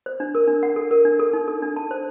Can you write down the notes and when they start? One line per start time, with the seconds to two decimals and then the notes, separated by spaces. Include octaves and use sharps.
0.06 C5
0.20 D4
0.35 A#4
0.48 D4
0.63 F#5
0.76 A4
0.91 A#4
1.05 D4
1.20 A4
1.33 D#4
1.48 A4
1.62 D4
1.76 A5
1.91 C5